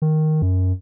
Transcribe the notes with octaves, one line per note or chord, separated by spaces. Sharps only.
D#3
F#2